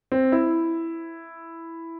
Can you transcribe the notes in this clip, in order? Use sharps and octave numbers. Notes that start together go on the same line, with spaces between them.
C4
E4